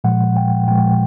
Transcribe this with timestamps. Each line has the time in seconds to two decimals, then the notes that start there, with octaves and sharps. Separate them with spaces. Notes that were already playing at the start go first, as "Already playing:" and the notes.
0.04 A#2 F3 G#3 F#5
0.37 G5
0.68 A#2 F3 G#3 G5